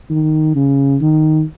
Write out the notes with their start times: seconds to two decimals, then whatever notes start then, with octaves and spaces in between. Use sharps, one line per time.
0.10 D#3
0.55 C#3
1.01 D#3